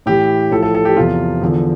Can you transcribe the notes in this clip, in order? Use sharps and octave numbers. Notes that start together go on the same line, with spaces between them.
A2 E3 G4
A2 F3 A4
A4
A4
G4
E2 C3 F3 F4
E2 D3 F3